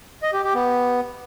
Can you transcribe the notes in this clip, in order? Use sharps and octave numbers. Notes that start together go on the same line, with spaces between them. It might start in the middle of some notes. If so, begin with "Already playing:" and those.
D#5
G4
G4
B3